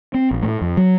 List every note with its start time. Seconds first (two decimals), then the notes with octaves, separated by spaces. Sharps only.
0.14 C4
0.31 A#1
0.43 A2
0.61 F2
0.77 F#3